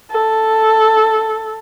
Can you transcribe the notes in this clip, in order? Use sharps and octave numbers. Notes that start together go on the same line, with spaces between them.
A4